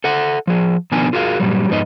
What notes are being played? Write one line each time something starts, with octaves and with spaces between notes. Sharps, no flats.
A4 E5 F#5
F3 G#4
B2 D#3 F3 B3 D4 G#5
F4 F#4 G#4 A#4 F5
G2 A#2 F#3 G3
F2 G#2 B3 D#4 E4 D#5